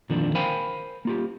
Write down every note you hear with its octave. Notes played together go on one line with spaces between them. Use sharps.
F2 A#2 D3 D#3 F3 D4
A#4 C5 F5 G5 G#5 B5
A#3 F4 G4